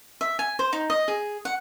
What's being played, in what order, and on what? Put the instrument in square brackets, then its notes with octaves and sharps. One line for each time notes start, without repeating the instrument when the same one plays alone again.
[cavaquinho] E5
G#5
C5
D#4
D#5
G#4
F#5